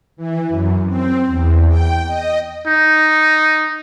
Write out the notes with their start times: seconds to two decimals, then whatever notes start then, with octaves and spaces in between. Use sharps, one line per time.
0.17 E3
0.49 F#2
0.87 C4
1.27 E2
1.69 G5
2.06 D#5
2.67 D#4